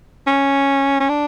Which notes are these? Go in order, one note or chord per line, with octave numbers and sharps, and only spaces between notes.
C#4
C#4
D4